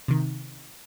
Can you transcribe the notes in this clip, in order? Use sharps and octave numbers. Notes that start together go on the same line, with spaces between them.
C3 D#3